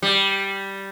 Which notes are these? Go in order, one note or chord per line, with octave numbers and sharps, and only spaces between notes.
G3